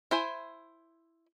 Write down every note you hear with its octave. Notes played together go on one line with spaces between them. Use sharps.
E4 C5 G#5